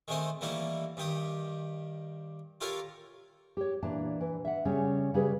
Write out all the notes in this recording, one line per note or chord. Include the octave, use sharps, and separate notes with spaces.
D#3 G#3 A3 C4 C5 D#6
E3 G3 A3 A#3 D#4 E4
G2 D#3 G4 D#6
F4 G4 A4 A#4 C#5 F5
G4 C#5
A#2 E3 D4 A5
E3
E5 F#5
C#3 G3 C#4
C#3 G3 G4 G#4 B4